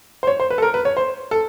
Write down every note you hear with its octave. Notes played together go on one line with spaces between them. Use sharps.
C5
C#5
C5
B4
A4
A#4
B4
C#5
C5
A4